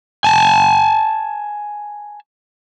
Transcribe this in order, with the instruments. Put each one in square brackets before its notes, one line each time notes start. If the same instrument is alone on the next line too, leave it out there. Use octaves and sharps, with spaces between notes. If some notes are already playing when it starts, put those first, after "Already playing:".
[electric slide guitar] G#5 A5